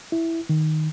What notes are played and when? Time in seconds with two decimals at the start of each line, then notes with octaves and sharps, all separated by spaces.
0.12 E4
0.49 D#3